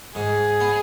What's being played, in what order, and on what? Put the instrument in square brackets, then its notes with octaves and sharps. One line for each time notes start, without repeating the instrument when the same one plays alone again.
[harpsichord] G#2 [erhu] G#4
[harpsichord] B3